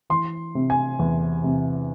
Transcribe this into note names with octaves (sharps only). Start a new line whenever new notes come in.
E3 C6
C3
G#5
E2
C3